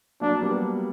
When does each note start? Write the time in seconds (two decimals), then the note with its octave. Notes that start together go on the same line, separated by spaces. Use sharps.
0.21 F#3 A#3 D4
0.42 G3 B3